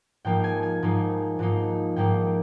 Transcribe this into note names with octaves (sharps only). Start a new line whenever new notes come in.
G#2 F3 A#3 D#4 G5
G#5
G#5
G#2 F3 A#3 D#4
G#2 F3 A#3 D#4
G#2 F3 A#3 D#4 G5